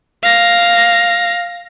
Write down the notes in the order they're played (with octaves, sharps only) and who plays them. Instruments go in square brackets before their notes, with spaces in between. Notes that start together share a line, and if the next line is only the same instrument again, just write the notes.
[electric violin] F5 A#6